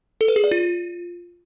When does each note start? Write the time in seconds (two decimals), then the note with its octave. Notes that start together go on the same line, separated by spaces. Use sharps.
0.21 A4
0.28 B4
0.36 G#4
0.44 D5
0.51 F4